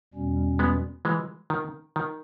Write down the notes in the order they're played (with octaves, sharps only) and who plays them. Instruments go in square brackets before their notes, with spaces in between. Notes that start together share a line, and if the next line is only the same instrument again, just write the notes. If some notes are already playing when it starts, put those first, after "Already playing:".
[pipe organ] E2 B2 G3 C#4
[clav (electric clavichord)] G#3 B3
E3 G#3
D#3
D#3